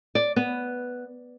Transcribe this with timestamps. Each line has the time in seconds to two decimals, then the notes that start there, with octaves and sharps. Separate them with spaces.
0.15 D5
0.36 B3